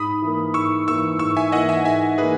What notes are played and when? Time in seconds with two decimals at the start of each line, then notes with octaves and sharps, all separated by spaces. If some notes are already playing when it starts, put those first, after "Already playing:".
Already playing: G#2 B5 D#6
0.22 E3 A#3
0.54 G#2 C#6 E6
0.87 E3 A#3 C#6 E6
1.19 G#2 C#6 E6
1.37 E5 G#5
1.52 E3 A#3 D#5 F#5
1.69 E5 G#5
1.85 G#2 E5 G#5
2.18 E3 A#3 G#4 B4